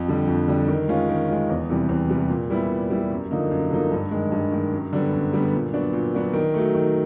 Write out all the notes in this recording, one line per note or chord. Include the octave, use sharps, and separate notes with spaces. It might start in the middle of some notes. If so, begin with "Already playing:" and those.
Already playing: F2
D3 G3
F2
D3 G3
D#3
G#3 C#4 F4
D#3
G#3 C#4 F4
E2
C3 E3 G3
E2
C3 E3 G3
A#2
G3 B3 E4
A#2
G3 B3 E4
F#2
D3 F3 A#3 D#4
F#2
D3 F3 A#3 D#4
G2
D#3 G#3
G2
D#3 G#3
F#2
D3 G3 B3
F#2
D3 G3 B3
A#2
F#3 B3 D4 F#4
A#2
F#3 B3 D4 F#4
D#3
F#3 A3
D#3